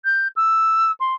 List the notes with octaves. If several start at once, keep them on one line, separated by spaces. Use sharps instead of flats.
G6
E6
C6